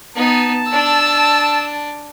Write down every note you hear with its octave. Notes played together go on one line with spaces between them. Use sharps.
B3 D#4 A5
D4 E6